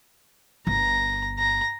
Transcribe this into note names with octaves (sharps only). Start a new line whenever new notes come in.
G1 A#5
A#5